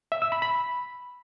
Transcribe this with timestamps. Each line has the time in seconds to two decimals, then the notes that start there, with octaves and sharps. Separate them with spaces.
0.12 E5
0.22 E6
0.32 B5
0.42 B5